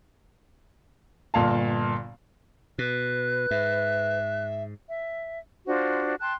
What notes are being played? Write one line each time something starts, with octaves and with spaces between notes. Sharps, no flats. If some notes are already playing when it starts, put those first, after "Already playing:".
G1 A#2 F5 A5
B2 B4 F#6
G#2 E5
E5
D4 F4 F#4 C5
G5 A5 C6 F#6